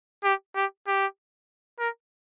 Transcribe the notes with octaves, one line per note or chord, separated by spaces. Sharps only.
G4
G4
G4
A#4